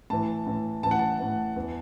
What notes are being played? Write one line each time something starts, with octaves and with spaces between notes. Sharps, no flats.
A2 E3 A5
A2 E3
A2 E3 A5
F#5
A5
A2 E3
E2 E3